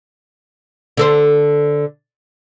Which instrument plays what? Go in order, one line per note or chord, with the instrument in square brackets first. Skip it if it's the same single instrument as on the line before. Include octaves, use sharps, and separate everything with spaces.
[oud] D3 A4 C5